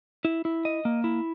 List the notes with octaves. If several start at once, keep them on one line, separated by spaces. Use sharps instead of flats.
E4
E4
D#5
A#3
E4